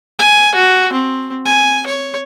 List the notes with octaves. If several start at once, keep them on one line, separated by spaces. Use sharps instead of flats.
G#5
F#4
C4
G#5
C#5